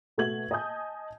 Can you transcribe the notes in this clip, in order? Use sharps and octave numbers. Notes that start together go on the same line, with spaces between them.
B2 A3 F#4 G#6 F#7
D#5 G#5 A5 D#6 G6